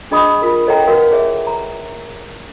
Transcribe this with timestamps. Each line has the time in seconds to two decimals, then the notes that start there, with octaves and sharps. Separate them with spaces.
0.11 D4 G#4 D#5 B5 D#6
0.42 F4 A#4
0.67 A4 C#5 D#5 F#5 G5 A#5
0.87 F#4 A#4 B4 F5 F#5
1.11 G#4 C#5 E5
1.47 A#5